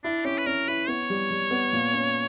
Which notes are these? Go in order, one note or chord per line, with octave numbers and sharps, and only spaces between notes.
D4 E4
C#4 G4
B4
C#4 A#4
E4 B4
B3 C#5
G3
G3
B3
A#2
C#4